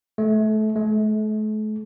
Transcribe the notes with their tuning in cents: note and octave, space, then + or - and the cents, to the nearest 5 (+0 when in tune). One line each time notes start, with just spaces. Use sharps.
A3 -25
A3 -40